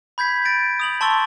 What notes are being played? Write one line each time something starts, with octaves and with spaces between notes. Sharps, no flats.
B5 G6 G#6 B6
A6 D7
D#6 F7 F#7
A5 C6 C#6 E6 A6